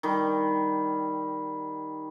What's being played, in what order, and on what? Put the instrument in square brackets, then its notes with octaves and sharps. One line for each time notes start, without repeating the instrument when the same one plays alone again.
[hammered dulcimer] D#3 G3 D#4